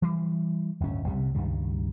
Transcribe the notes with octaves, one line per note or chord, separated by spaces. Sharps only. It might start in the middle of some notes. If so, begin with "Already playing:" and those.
E3 G3
D1 G1 D2 C#4
C2 C3 G3
C#2 G2 D#3 G3